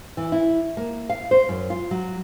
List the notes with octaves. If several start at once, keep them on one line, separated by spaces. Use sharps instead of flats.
E3
E4
A#3
F5
C5
F#2
F4
F#3